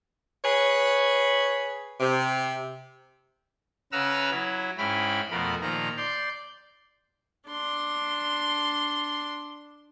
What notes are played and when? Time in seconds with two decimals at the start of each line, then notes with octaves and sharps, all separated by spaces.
0.44 G#4 B4 C#5
2.00 C3
3.92 C#3 B4 F#5 A#5 E6 F6
4.31 F#3 E4
4.78 G#2 C#4 E4 G5 B5 F6
5.31 F2 B2 A3 A#4 B5
5.61 A#2 D#3 F3 A#5
5.97 D5 C6 G6
7.49 D4 C6